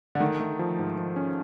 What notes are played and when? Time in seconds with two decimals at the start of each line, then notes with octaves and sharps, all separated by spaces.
0.15 D3
0.20 D#3 A3
0.40 A3
0.59 F3
0.79 G#2
0.98 F3
1.16 C#4